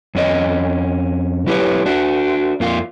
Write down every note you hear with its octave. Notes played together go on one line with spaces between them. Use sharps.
F2 C#4 D#5
F#3 E4 G4 B4 C#5
D4 F#4
F2 A#3 F4